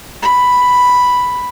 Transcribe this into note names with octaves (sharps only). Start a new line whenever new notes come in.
B5